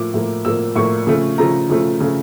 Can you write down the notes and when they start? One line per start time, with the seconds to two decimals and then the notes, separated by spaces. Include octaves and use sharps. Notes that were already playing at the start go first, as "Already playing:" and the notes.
Already playing: A2 F3 A#3 D6
0.14 A2 F3 A#3
0.45 A2 F3 A#3 E6
0.76 A2 F3 A#3 C#6
1.07 C#3 F3 A3
1.38 C#3 F3 A3 A#5
1.70 C#3 F3 A3
2.01 C#3 F3 A3